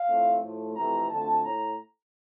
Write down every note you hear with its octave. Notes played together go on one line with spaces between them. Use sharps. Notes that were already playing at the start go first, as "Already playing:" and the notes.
Already playing: F5
A2 F3 A3 C4
A2 F3 A3
F2 C3 E3 A3 C4 A#5
D2 D3 F3 A3 C4 A5
A2 A#5